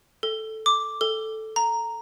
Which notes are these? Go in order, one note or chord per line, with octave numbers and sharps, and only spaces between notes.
A4
D6
A4
A#5